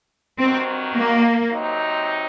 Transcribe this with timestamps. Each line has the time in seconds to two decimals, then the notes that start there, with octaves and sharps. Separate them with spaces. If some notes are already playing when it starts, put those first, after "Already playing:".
0.38 G2 D#3 F#3 C4
0.95 A#3
1.50 C3 F#3 C4 D#4